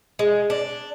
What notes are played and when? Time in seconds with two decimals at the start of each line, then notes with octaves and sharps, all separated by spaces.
0.19 G#3
0.50 D4